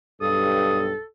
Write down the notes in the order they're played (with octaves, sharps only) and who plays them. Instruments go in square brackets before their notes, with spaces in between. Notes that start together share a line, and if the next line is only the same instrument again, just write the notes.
[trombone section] B1 G2 [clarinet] A4 [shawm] D#6